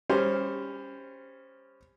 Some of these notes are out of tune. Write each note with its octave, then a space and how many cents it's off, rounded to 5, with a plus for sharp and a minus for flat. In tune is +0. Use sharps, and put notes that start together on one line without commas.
G3 +25 C#4 +0 C5 +0